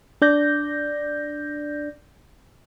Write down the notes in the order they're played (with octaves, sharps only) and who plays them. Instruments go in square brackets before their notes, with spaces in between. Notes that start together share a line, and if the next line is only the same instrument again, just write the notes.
[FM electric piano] D4 D5 G6 A#6